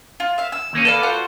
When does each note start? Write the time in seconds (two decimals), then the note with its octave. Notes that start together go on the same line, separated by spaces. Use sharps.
0.20 F4
0.38 E5 F5
0.52 E6
0.73 D#2 A#3 C#4
0.85 A4 B4 D5 F5
1.03 F4 F#4 C5